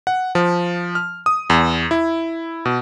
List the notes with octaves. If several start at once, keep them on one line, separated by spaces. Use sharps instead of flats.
F#5
F3
F6
D#6
E2
E4
B2